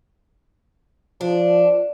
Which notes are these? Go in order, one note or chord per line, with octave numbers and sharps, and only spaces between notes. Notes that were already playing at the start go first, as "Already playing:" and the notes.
F3 D4